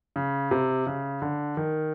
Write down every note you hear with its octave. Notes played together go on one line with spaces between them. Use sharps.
C#3
C3
C#3
D3
D#3